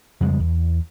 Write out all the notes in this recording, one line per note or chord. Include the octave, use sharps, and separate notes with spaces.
F2 C#3 G3 G#3
E2